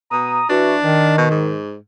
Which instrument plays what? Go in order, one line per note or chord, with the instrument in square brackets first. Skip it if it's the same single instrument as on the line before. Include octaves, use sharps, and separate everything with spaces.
[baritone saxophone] B2 [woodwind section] A#5 D#6
[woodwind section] E3 F#4 [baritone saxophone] D4
[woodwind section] D#3
[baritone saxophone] B2
G#2